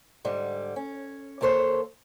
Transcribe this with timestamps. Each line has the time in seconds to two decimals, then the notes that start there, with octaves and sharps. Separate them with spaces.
0.25 G#2 D3 G3
0.76 C#4
1.41 D#2 A#3 A4 C5 C#5